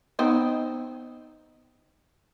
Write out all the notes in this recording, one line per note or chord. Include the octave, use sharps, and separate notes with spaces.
B3 C4 D#4